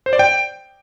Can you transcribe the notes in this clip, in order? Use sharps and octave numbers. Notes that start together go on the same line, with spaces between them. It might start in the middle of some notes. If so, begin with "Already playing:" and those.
C5
D5
G5